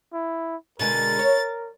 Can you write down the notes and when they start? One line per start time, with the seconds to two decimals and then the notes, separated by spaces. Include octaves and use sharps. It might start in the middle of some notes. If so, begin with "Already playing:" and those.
0.13 E4
0.79 B2 D3 G#3 A#4 A6
1.19 C#5